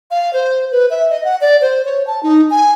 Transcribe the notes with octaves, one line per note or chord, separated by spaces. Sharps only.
F5
C5
B4
E5
D#5
F#5
D5
C5
C#5
A5
D#4
G#5